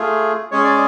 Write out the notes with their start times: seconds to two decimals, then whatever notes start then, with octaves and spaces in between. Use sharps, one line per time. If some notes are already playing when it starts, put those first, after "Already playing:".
Already playing: A3 F4 G#4
0.51 G#3 C#4 G#4 C#5
0.64 D5